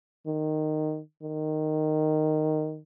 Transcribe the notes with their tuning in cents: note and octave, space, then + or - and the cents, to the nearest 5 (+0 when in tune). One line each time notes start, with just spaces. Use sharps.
D#3 -10
D#3 -10